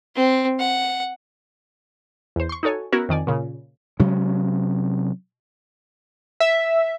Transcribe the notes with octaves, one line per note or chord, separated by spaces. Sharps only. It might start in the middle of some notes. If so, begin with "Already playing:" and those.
C4
F#5
E2 C5
C6 C#6
D#4 F#4 A4 C#5 G#5
B3 C#4 E4 F#4 A#4
F2 D#3 D5 G#5
A#2 C#3
C3 F#3 G#3 C#4
E5